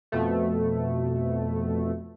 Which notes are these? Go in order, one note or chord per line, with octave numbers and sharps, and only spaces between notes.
F2 B2 A3